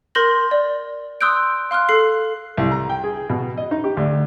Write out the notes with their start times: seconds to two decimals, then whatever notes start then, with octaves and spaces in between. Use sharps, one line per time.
0.15 A#4 C6 G6 A#6 F#7
0.51 D5
1.21 C6 D#6 E6 F#6 G6 D7
1.71 F5 C6 F6 F#6
1.89 A4 C7
2.57 C2
2.72 A#5
2.90 G5
3.04 G#4
3.30 B2
3.57 D#5
3.71 D#4
3.84 G4
3.97 D2